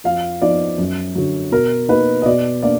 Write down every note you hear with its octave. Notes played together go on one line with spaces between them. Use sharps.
F2 F5
F3 B3 D#4 D5
F#2
D3 F#3
B2 A#4
A#3 D#4 B4
D#5
B2 D5
A#3 D4 D5